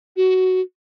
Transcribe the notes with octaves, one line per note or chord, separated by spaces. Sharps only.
F#4